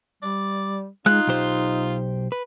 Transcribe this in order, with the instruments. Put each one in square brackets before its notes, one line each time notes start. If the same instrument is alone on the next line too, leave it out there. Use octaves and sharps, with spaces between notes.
[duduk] G3 [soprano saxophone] D5
[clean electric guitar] G#3 [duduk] D#4 [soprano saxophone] F4 [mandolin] F#6
[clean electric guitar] B1 G4 C5
B4